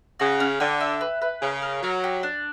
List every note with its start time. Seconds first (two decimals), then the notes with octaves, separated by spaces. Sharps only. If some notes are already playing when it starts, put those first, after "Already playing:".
0.19 C#3 F#4
0.40 C#4
0.60 D3 G5
0.80 E5
1.01 B4
1.22 B4
1.42 C#3 A#4
1.62 A#4
1.83 F#3 A#4
2.04 G4
2.23 D4